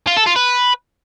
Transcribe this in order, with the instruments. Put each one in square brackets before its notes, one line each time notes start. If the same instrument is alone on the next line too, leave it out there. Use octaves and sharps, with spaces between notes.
[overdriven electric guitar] F4
A4
F4
B4